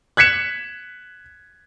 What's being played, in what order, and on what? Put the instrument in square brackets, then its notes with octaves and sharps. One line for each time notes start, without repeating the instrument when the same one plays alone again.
[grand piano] F#6 G#6 B6 C#7 E7